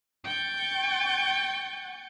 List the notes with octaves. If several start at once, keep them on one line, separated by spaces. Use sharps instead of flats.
G5 C#6 G6 A6